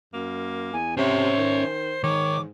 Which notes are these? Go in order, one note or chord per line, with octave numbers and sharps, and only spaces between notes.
F#2 A#3
E2 G#5
C3 C#4 C5 C#5 E5
D#3
G#2 D#3 C#5 D6